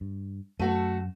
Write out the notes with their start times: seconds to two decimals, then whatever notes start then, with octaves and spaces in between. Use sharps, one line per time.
0.01 G2
0.59 F#2 A3 F#4 A4